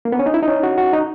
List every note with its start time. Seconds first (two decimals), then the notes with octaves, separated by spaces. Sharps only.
0.05 A#3
0.12 B3
0.19 C#4
0.26 D#4
0.34 E4
0.43 D#4
0.48 C#4
0.63 F#4
0.78 F#4
0.93 D#4